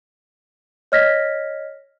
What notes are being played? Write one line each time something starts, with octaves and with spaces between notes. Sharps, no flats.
C#5 D#5 F6 G#6 A#6 B6